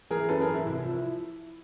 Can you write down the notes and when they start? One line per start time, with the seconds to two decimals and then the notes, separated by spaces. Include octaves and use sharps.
0.10 E3 G#4 A#4
0.28 F#2 A4 B4
0.40 G#4 A#4
0.47 E3
0.54 E4
0.65 C2 E4
0.77 E4
0.84 F3
0.90 E4